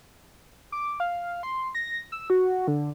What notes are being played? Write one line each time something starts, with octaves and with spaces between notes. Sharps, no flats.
D6
F5
C6
A#6
E6
F#4
D3